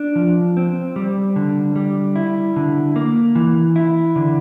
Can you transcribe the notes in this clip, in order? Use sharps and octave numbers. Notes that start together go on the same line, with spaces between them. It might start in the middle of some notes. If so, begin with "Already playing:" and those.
Already playing: D4
F3
C4
G3
D3
G3
E4
D3
A#3
E3
E4
D3